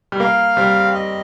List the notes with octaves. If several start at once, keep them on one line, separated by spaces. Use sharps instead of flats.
G3
A#3 F5
G3 C4
D#5